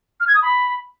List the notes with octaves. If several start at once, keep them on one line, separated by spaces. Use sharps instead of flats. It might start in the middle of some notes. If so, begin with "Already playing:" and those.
F6
G#6
D#6
B5